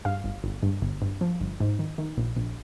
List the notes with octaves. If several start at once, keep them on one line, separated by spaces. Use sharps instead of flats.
G2 F5
G1
G1
G2
G1
G2
F3
G1
G#2
D#3
D#3
A#1
A#1